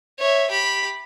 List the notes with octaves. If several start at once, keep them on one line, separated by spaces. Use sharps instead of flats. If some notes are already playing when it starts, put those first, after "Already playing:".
C#5 E5
G4 B5